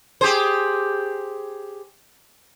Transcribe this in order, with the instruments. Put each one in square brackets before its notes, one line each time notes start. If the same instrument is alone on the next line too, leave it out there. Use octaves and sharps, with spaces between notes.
[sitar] G4 G#4 C5